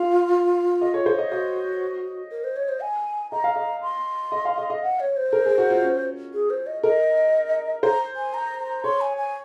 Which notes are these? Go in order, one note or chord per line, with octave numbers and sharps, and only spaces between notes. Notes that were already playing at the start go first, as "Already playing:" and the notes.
Already playing: F4 F5
D#5
C#5
C5
D#5
F#4 D#5
A#4
C5
C#5
C5
G#5
D#5 A#5
F5
D#5
C6
D#5
F5
D#5
D#5
F#5
C#5
C5
A#4
G#4
F#4
F4
C#4
G#4
C5
D#5
A#4 D#5
C5 A#5
G#5
A#5
A#5
C#5 C6
G#5
G#5